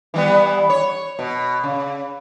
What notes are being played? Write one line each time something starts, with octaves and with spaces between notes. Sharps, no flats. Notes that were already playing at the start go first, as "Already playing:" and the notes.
E3 G3 B3
C#5
B2
C#3